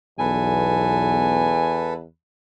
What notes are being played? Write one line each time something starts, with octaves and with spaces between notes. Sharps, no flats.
B1 E2 A4 B4 G#5